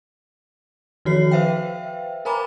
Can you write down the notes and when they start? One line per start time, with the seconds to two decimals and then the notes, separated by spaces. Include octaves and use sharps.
1.05 D#3 F3 F#4 C#5 C7
1.31 B4 C5 E5 F5 G5
2.25 A#4 C5 G#5 A#5 B5 D6